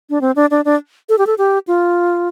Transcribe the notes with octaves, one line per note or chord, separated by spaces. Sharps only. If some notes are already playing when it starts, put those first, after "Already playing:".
D4
C4
D4
D4
D4
A4
G4
A4
G4
F4